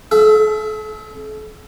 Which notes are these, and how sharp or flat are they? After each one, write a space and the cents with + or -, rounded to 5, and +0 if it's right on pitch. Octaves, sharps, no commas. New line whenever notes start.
A4 -40 E5 +30